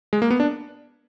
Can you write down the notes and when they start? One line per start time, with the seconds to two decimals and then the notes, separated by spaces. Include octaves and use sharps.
0.13 G#3
0.22 A#3
0.30 B3
0.40 D4